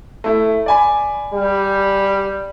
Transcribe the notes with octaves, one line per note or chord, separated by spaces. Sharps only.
A3 E4
D5 G#5 B5
G3